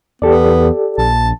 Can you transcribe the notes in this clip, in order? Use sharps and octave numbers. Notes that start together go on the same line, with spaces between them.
E2 B3 G4 A4 D5
A#1 A5